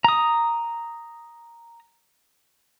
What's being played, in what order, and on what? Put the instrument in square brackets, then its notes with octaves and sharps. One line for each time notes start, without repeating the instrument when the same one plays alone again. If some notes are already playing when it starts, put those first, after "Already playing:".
[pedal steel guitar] A#5 D#6